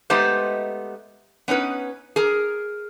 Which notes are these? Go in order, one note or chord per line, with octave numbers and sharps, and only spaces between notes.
G#3 A3 B3 D#4 G4 C5
B3 C#4 D#4 B4
G#4 A#4